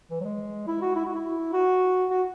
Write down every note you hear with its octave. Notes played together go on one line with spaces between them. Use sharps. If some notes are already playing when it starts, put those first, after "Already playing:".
E3
F#3
G#3
E4
F#4
E4
F#4
E4
F#4
F#4